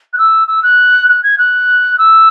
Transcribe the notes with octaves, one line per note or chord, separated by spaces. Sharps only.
F#6
E6
E6
F#6
F#6
G#6
F#6
E6